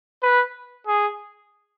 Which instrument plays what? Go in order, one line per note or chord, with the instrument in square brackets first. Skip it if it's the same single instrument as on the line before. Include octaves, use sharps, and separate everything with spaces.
[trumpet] B4
G#4